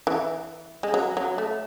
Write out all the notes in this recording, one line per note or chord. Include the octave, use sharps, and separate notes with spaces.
E3
G#3
F#3
F#3
A3